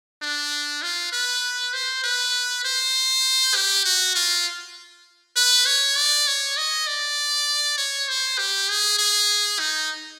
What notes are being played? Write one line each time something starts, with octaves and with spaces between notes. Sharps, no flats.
D4
F4
B4
C5
B4
C5
G4
F#4
F4
B4
C#5
D5
C#5
D#5
D5
C#5
C5
G4
G#4
G#4
D#4